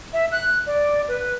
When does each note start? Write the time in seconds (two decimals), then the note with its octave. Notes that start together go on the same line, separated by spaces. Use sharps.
0.13 E5
0.32 F#6
0.66 D5
1.08 B4